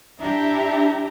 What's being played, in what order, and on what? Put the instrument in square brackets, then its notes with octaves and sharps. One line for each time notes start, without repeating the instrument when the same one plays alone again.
[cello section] D4 E4 G4 [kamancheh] E5 A#5